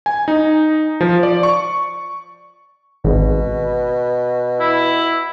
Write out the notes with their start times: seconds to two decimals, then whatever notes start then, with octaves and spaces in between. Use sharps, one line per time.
0.06 G#5
0.28 D#4
1.01 F3
1.23 D5
1.43 C#6
3.05 G#1 B2
4.60 E4